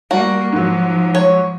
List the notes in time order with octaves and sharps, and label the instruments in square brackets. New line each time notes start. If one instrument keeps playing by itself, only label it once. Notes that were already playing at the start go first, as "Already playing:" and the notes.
[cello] G3 A#3 [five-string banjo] F#4
[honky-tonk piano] G#2 F#3 [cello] F3
[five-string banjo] C#5